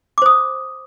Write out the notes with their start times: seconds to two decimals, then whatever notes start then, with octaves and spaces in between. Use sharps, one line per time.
0.18 D6
0.22 C5
0.26 D#6